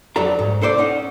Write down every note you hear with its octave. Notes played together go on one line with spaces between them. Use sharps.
F2 F#3 D4 A4 A#5
C2 G#2
D4 A4 C5 D5
C#4 D#4 F#5